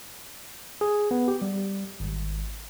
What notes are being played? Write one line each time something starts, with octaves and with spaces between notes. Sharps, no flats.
G#4
B3
G4
G3
G#1